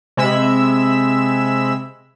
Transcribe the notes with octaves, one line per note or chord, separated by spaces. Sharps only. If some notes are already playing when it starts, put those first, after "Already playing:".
C3 G#3 E5 B5 E6